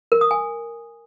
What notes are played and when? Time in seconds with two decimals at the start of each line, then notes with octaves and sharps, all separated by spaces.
0.12 A#4
0.21 D#6
0.31 G#5